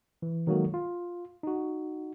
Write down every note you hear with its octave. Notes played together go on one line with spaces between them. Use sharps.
E3
D#3 F#3 G#3 A#3 F#4 A4
F4
D#4 F#4